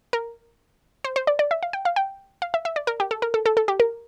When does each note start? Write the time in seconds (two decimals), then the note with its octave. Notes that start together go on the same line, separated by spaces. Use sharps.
0.13 A#4
1.04 C5
1.16 C5
1.27 D5
1.39 D5
1.51 E5
1.63 F5
1.73 G5
1.85 F5
1.96 G5
2.42 F5
2.54 E5
2.65 E5
2.76 D5
2.87 A#4
3.00 G4
3.11 A4
3.22 A#4
3.34 A4
3.46 A4
3.57 A4
3.68 G4
3.80 A#4